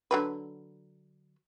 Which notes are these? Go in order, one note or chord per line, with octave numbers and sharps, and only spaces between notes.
D3 F#3 B4